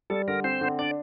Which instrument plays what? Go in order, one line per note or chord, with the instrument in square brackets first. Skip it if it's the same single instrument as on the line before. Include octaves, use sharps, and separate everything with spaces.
[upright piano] G3 [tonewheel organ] A4
[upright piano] D3 [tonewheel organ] A#4
[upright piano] C4 [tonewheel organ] C5
[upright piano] D3
[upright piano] D4 [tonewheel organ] D5